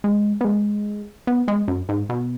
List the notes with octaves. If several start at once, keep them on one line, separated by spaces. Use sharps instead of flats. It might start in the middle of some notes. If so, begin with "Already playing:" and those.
G#3
B3
G#3
B3
G#3
F#2
G#2
B2